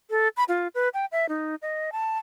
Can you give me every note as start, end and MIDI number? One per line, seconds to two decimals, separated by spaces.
0.10 0.28 69
0.37 0.44 83
0.48 0.68 65
0.75 0.89 71
0.94 1.05 79
1.12 1.29 76
1.29 1.55 63
1.62 1.90 75
1.92 2.18 81